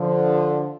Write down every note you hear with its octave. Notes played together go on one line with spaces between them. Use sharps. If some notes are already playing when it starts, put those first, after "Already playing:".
Already playing: D3 F3